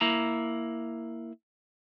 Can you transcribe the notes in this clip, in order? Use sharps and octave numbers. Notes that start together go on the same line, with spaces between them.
A#3 E4 A#5